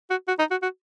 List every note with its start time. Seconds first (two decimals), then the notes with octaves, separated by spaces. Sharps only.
0.10 F#4
0.28 F#4
0.39 D#4
0.51 F#4
0.62 F#4